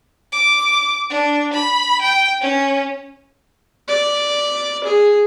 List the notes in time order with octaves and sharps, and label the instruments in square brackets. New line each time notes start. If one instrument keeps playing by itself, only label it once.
[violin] D6
D4
B5
G5
C#4
[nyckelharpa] D5
G#4